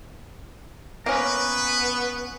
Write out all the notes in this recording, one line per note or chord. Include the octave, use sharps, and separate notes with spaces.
A#3 B3 C#4 B4